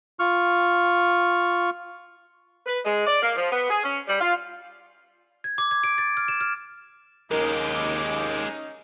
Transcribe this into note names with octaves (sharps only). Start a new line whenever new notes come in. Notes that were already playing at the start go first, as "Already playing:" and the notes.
F4 C#6 F6
B4
G#3
D5
A#3
F3
B3
G#4
C#4
G3
F4
G#6
D6
G#6
D7
A6
F6
E7
F6
D#2 G#3 C#4 D#4 G4 A#4 D6